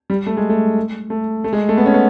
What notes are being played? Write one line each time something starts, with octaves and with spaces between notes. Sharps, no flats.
G3
A3
G#3
A3
A3
A3
G#3
A3
B3
C#4
B3